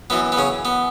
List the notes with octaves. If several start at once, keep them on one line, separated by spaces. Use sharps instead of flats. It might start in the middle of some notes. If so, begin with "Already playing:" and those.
F#2 E3 B3
B3
C#3 C#4
B3